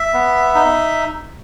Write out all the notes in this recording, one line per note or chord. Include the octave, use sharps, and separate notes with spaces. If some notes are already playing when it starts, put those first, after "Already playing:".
Already playing: E5
B3
D#4